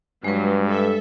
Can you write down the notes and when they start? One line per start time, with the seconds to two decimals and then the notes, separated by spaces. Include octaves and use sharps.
0.24 G2 F#3 G#3 B4
0.67 A4 E5